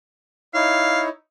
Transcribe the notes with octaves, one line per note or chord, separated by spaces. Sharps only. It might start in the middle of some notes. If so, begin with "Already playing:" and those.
D#4 E4 C#5 F5